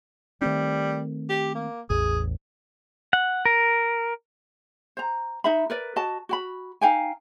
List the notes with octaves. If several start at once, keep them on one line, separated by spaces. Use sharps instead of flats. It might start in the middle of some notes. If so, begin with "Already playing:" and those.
D#3 G3 A3 C4
G4
A#3
A1 E2 G#4
F#5
A#4
C5 A#5
D#4 E5 B5
A#4 B4 D5
F#4 D#5 A5
F#4 G5 B5
D#4 F5 G5 G#5